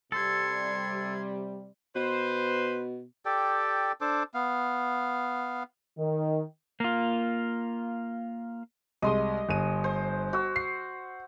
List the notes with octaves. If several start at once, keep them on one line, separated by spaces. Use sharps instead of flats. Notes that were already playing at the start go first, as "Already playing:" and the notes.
C3 G3 A4 C6 G#6
B2 B4 C5
G4 A4 D5 G5
D4 A4 C5 D6
B3 F5
D#3
A#3 F4
C2 G#3 D#5 C6 D#6
G1 D#7
C5
F#4 E6
C7